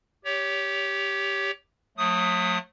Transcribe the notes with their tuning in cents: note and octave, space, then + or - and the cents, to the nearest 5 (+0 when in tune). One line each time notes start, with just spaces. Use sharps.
G4 +0 C#5 +25
F#3 -40 A3 +5 D#6 +0